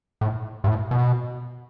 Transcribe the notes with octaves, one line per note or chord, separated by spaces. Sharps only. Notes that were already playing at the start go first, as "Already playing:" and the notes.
A2
G2
A2
B2